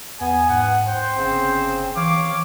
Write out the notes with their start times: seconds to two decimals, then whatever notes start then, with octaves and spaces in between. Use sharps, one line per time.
0.21 E2 B3 G#5
0.50 G#2 F#5
0.87 C5 G5
1.17 G1 C#3 C4
1.96 E3 C#5 F5 D6